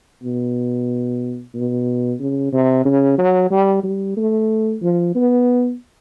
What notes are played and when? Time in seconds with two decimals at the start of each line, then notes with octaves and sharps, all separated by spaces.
0.23 B2
1.54 B2
2.20 C#3
2.52 C3
2.85 C#3
3.18 F#3
3.51 G3
3.84 G3
4.17 A3
4.82 F3
5.15 B3